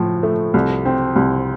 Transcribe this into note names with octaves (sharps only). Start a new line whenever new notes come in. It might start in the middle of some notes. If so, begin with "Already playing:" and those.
Already playing: A2 F3
A3
C2
C4
C2